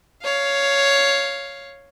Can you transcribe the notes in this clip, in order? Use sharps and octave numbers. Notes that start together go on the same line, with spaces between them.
C#5 F5